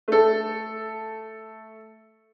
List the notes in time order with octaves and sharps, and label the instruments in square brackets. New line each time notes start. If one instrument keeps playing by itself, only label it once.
[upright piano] A3 A4